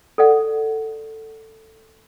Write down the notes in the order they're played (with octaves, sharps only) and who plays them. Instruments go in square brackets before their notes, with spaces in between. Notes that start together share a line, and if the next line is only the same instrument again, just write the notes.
[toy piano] A4 D5 F#5